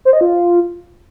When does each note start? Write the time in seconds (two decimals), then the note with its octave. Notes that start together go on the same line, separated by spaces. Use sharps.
0.05 C5
0.13 D#5
0.21 F4